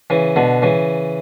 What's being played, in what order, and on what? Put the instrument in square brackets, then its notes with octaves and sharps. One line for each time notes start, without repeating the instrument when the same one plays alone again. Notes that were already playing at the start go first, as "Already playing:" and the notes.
[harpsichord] C#3 E3
B2 D3
C#3 E3